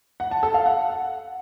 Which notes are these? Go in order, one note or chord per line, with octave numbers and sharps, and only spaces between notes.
F#5
A5
A4
F5
F#5